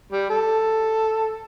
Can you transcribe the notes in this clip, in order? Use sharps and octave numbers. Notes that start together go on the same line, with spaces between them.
G3
A4